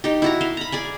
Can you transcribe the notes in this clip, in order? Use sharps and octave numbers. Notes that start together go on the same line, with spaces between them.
D#4 G4
E4 F#4 A#5
E5 F5 C6
A#5 B5
G#4 D5 G#5